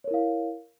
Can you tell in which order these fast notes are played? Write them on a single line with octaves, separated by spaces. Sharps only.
C#5 A#4 E4 F5